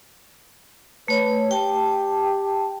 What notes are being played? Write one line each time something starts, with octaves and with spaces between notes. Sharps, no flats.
A3 B4 C#5
G4 G5 A5